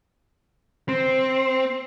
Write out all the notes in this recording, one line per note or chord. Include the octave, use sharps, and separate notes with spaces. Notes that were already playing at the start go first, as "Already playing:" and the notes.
C4